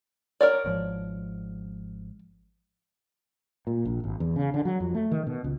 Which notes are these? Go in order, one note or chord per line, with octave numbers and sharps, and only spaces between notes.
A#4 C#5 D5
G#1 G#2 F3
A#2
A#1
G#1
E2
C#3
D3
F#3
F2
A3
D#3
B2
C#2